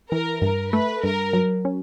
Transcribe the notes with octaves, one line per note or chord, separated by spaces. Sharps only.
E3 A#4
G2 A#4
A3 B4
G2 A#4
F#3
C#4